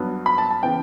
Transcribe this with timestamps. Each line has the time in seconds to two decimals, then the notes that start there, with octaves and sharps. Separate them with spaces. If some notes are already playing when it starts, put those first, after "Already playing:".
Already playing: G2 F#3 B3
0.26 B5
0.38 A5
0.51 A5
0.63 C#3 E3 B3 G5